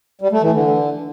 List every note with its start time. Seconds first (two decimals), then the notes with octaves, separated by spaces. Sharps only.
0.21 G3
0.32 A3
0.42 E3
0.53 D3